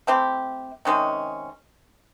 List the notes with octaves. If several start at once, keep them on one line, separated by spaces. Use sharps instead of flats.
A3 C4 E4 G4
C3 D#3 G#3 C#4